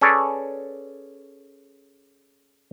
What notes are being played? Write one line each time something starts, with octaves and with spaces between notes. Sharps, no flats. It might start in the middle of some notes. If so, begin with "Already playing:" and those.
C#4 G#4 A4 B4 C#5 D5